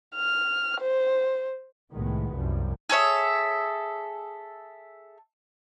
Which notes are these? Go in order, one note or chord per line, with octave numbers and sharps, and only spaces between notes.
F6
C5
C2 A2 D#3 G#3 B3
C2 F#2 F3 G3
G#4 A4 C#5 E5